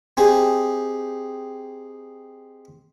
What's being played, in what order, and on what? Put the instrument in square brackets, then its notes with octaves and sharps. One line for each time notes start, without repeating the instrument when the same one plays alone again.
[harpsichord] C4 D#4 G4 G#4